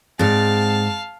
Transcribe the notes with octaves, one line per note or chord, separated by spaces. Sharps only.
G#2 C4 G#4 D5 F5 A5 A6